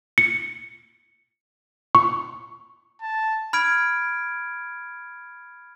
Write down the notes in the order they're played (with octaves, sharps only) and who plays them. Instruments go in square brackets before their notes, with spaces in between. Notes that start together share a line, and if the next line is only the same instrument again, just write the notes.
[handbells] C#7
C#6
[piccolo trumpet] A5
[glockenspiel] B5 F6 G#6 D7